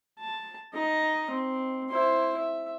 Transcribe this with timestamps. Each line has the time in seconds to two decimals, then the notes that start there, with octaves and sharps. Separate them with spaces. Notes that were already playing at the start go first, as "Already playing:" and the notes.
0.19 A5
0.74 D#4 D#5
1.30 C4
1.90 E4 C5
2.37 E5